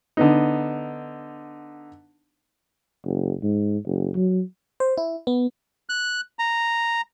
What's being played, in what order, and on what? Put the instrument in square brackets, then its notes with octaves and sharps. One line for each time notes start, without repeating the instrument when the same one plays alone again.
[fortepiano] D3 B3 D#4
[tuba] F#1
G#2
F#1
F#3
[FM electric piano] C5
E4
B3
[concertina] F#6
A#5